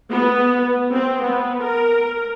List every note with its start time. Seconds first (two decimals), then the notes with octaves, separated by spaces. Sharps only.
0.11 B3
0.94 C4
1.23 B3
1.61 A#4